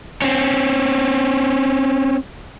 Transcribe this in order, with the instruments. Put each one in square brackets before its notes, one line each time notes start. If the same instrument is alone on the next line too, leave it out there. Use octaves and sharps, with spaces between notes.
[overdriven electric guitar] C4 C#4